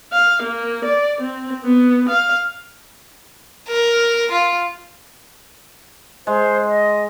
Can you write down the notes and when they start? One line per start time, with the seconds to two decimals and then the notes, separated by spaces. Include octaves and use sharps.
0.13 F5
0.43 A#3
0.85 D5
1.21 C4
1.64 B3
2.09 F5
3.68 A#4
4.31 F4
6.27 G#3 C5
6.68 D#5